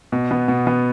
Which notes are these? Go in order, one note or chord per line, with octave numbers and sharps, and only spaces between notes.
B2
B3
B2
B3